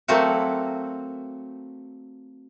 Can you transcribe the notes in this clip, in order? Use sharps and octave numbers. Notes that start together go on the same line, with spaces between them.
F#3 A3 A#3 C4 F#4